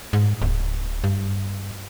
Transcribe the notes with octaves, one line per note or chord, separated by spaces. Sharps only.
G#2
D1
G2